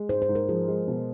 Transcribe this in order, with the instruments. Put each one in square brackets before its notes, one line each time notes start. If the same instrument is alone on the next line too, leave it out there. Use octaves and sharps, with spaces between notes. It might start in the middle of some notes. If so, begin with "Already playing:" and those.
Already playing: [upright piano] G#3
[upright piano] G#2 [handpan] C5
[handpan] C5
[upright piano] G#2
[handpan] A#4
[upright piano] F3 [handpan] G#4
[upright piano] G#3
B2